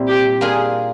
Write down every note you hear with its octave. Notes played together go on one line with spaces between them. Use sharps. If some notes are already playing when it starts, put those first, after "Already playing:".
Already playing: A#2 G3 C4 E4
G4
A#3 D4 F4 G#4 A#4